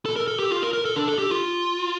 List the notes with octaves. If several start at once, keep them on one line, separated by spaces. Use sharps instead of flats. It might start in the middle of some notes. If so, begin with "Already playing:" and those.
A4
A#4
A4
G4
F4
A#4
A#4
A4
D4
A4
G4
F4